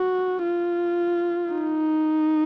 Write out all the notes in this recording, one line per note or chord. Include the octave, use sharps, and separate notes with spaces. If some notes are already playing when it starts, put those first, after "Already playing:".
Already playing: F#4
F4
D#4